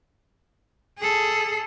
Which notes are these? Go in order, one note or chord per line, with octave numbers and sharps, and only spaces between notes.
G#4 A4